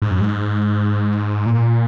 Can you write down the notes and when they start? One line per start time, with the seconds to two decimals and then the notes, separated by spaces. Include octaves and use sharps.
0.02 G#2
0.11 F#2
0.21 G#2
1.46 A#2